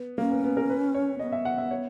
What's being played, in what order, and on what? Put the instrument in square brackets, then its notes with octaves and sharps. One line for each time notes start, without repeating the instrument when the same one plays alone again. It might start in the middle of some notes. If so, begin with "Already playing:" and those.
Already playing: [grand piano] B3
[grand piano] A#3 [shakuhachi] C#4
[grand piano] B3
B3
A#4
B4
C#5
[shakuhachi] B3 [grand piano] D#5
[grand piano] E5
F#5
E5
C#5